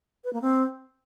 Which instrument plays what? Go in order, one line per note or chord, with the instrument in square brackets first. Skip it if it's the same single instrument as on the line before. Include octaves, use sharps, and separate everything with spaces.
[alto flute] B4
A#3
C4